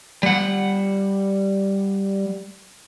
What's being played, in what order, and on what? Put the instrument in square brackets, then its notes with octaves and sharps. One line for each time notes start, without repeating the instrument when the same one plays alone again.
[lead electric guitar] G3 F#5